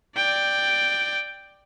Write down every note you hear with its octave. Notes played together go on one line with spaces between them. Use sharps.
D5 G5